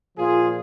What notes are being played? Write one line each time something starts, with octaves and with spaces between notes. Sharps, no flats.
A#2 F3 F4 G#4